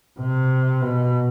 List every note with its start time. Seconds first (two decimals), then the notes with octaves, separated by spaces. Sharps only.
0.20 C3
0.82 B2